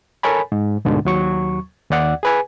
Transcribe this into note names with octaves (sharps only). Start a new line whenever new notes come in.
A4 A#4 C#5 G#5 B5
G#2
D2 G#2 B2 D3
D#2 F#3 C#6
D#2 D5 F#5
G#4 B4 G#5